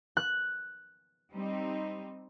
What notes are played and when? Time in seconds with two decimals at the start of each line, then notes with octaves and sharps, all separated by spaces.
0.17 F#6
1.33 G3 C4 D#4